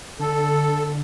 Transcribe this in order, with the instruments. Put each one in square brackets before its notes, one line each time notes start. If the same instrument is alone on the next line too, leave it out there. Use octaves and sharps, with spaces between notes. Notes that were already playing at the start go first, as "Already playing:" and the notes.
[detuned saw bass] D3 [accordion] A4